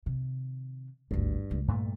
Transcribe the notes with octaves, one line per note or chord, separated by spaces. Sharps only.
C3 D#3
G#1 D2 G2
C#2 A#3
E2 G2 A#2 A3